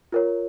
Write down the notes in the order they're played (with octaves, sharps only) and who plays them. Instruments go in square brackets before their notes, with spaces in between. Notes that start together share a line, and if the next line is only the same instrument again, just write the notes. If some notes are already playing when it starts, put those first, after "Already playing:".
[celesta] F4 A#4 C#5